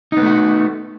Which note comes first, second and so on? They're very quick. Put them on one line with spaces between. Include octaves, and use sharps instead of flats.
D#4 B3 A3 F#4